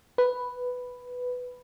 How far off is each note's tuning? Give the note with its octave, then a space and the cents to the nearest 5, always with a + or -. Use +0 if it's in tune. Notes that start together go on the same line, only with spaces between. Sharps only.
B4 +5